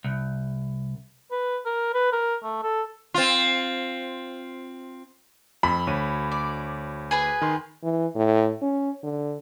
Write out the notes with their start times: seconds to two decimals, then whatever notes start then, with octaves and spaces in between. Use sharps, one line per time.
0.04 C2
1.31 B4
1.66 A#4
1.94 B4
2.12 A#4
2.43 A3
2.63 A4
3.14 C4 F4
5.63 F2 B5
5.87 D2 C#5 D#7
6.32 D5
7.11 G#4 B4 G#5
7.42 D#3 C6
7.83 E3
8.15 A2
8.62 C#4
9.03 D3